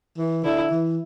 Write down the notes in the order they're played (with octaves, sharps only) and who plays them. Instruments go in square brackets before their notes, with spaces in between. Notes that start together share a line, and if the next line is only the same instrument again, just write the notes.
[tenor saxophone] E3
[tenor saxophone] D3 [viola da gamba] E4
[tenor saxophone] E3